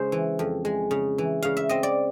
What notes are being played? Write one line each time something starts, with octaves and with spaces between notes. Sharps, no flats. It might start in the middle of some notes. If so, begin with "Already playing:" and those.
Already playing: C#3 G#3 C5
E3
F2
G#3
C#3
E3
C#3 F5
E5
C4 D#5
D5